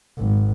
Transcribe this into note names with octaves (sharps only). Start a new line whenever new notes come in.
G#1